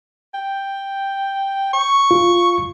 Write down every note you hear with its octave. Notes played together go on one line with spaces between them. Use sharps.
G5
C#6
F4